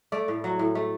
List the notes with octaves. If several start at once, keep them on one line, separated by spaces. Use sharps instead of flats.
A3 D5
A2
F#3
A2
A3